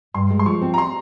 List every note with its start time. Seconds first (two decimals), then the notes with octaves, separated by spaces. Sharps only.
0.14 G2 C6
0.30 G#3
0.39 C6
0.46 F3 C#6
0.62 C4
0.74 A#5
0.78 C6